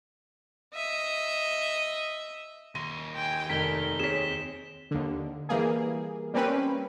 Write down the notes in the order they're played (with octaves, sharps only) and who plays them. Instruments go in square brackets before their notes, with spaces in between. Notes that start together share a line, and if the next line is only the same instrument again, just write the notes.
[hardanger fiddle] D#5 E5
[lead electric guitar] D#2 C6 [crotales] A#6 [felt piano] D#7
[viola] G5 G#5
[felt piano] F1 [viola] D#3 [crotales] B6 G7
[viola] C4 [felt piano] G#4 C#5 [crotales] B6 E7
[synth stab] D#2 D3
E3 G3 A#3 G#4
G3 A#3 C4 C#4 B4